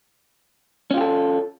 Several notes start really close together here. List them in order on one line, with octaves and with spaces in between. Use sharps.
C#4 F4 G4 A4